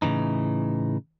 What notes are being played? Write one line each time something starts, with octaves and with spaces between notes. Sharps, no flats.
A2 C#3 E3 D#4